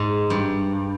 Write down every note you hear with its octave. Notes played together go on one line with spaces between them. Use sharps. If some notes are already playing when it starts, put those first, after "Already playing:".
Already playing: G#2
G2